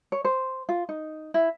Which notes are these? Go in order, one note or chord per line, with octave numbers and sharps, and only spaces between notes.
C#5
C5
F4
D#4
E4